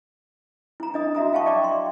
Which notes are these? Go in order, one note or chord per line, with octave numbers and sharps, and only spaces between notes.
E4 A#5
D4 D#5 D#6
F#4 E5 A#5 D#6
E5 F5 G5 A5 C#6
D5 D#5 G5 A#5 C#6 D6
C6